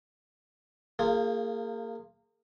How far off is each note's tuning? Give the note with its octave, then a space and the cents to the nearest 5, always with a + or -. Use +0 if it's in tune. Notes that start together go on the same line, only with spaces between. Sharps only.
A#3 -30 F4 +0 G#4 -10